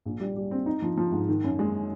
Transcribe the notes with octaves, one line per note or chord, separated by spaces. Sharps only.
A#1
G3
G3
C4
D#4
F3
F3
G#2
D#3
F#2
G#3